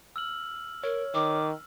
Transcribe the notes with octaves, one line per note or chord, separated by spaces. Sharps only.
E6 F6 F#7
A#4 C#5
D#3 D6